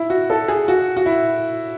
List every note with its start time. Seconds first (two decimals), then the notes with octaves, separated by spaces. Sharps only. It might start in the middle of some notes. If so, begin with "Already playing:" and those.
Already playing: E4
0.10 F#4
0.30 A4
0.48 G#4
0.68 F#4
0.97 F#4
1.06 E4